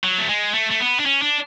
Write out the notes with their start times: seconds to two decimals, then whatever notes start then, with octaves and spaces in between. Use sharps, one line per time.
0.04 F#3
0.18 A3
0.29 G#3
0.54 A3
0.71 A3
0.80 B3
0.99 D4
1.06 C#4
1.22 D4